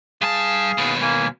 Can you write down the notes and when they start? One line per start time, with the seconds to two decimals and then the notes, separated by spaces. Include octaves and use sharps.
0.21 G2 G#4 F5 A5
0.78 D#2 B2
1.01 A#3 G#5